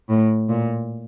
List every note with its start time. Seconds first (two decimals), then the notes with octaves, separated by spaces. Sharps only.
0.09 A2
0.49 A#2